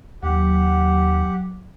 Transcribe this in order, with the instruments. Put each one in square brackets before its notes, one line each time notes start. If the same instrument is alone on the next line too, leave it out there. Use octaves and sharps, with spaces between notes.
[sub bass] D#2 [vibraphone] F#3 [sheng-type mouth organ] G4 F#5